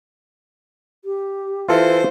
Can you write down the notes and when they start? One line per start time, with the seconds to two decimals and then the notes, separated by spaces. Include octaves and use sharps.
1.05 G4
1.69 E3 F4 A4 C5 E5